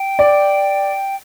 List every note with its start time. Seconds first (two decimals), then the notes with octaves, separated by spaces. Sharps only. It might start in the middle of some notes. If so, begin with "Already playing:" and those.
Already playing: G5
0.19 D5